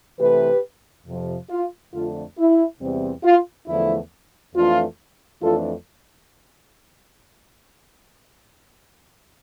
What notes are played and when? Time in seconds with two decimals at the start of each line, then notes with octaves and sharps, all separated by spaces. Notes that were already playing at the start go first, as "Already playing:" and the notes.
0.19 C3 E3 A3 G4 B4
1.06 F2 C3 F3
1.50 F4
1.93 F2 D3 A3 D4 F4
2.38 E4
2.81 E2 C3 G3 C4
3.24 F4
3.68 E2 D3 F3 A3 E4
4.55 F2 E3 A3 D4 F4
5.42 F2 E3 A3 D4 F4 A4